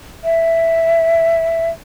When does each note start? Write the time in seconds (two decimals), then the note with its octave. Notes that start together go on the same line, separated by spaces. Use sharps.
0.24 E5